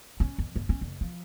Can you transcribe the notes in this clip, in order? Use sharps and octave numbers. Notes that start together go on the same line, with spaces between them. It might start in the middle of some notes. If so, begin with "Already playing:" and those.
C#4
F2
G1
C#4
F#1
F3